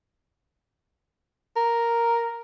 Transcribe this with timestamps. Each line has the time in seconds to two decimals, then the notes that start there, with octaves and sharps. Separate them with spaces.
1.56 A#4